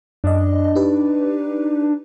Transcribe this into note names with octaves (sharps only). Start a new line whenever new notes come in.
F#2 D4 D#5
D#4 G4 B4